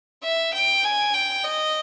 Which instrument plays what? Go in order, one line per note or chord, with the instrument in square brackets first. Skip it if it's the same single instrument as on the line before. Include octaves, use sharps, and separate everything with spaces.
[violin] E5
G5
G#5
G5
D#5